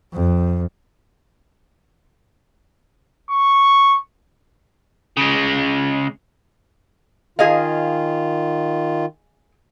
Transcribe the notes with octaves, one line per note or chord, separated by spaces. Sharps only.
F2
C#6
C#3 G#3
D#3 F4 G#4 D#5 F5